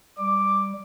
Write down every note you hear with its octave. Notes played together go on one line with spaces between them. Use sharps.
G3 D6